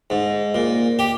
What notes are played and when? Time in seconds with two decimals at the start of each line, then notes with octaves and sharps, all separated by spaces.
0.10 G#2
0.55 A#2
0.99 G4